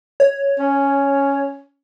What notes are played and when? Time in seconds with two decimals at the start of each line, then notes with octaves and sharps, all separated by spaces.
0.20 C#5
0.59 C#4